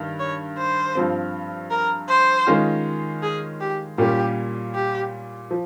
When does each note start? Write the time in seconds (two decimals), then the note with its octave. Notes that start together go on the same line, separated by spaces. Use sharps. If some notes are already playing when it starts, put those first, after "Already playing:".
Already playing: G2 D#3
0.19 C#5
0.58 C5
0.95 G2 F3 C4
1.71 A#4
2.09 C5
2.47 D#3 G#3 C#4 F4
3.23 G#4
3.61 G4
3.98 A#2 G3 A#3 C#4 F4 G4
4.75 G4
5.51 F3